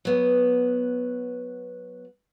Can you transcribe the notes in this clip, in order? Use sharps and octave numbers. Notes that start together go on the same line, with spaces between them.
F#3 B3